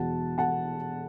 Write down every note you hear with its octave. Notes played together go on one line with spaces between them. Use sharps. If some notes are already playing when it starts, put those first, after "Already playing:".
Already playing: E1 E2 B2 F#3 F#5 A5
F#5 A5